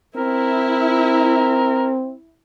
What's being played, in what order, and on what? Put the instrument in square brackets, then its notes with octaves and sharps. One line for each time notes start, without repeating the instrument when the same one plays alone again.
[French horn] C4 [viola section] E4 [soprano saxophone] A#4